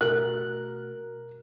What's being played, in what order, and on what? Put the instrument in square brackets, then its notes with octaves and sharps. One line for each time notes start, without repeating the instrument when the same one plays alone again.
[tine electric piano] B2 A3 F#4 [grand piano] A#4 [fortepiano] F#6